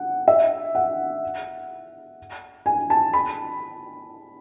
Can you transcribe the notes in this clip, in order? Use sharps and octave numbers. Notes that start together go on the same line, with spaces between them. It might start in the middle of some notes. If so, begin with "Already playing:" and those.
Already playing: F#5
E5
F#5
G#5
A5
B5